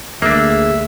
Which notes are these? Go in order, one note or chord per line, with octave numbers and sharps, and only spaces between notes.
D2 A#3 D4 G#4 E5